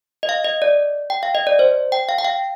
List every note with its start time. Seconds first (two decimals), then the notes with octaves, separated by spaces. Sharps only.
0.23 D#5
0.29 F5
0.44 D#5
0.62 D5
1.10 G5
1.23 F5
1.35 D#5
1.47 D5
1.59 C5
1.92 G5
2.09 F5
2.18 G5
2.25 F5